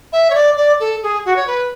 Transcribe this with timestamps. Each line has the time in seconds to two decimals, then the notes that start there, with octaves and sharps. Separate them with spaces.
0.12 E5
0.30 C#5
0.35 D5
0.56 D5
0.80 A4
1.03 G#4
1.25 F#4
1.36 C#5
1.47 B4